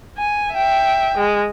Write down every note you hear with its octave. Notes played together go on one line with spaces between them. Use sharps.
G#5
E5 G5
G#3